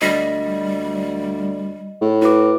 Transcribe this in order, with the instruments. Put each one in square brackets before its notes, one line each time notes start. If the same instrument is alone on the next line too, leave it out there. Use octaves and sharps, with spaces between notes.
[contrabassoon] D2 [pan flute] G3 [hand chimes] D#5 A#6 B6
[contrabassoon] A2
[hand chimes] E4 B4 D6 [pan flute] F#4